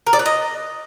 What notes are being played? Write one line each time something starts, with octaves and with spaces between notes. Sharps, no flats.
A#4
D5
B4
D#5